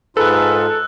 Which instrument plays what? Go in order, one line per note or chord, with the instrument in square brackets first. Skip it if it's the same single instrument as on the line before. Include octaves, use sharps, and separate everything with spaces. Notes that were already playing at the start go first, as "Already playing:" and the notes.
[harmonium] G#2 D#4 F4 [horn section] G#4 B4 [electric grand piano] A4 [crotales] E6 F#6